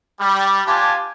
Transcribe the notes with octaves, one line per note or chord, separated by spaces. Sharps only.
G3
D4 F4 G4 G#5 A5 D6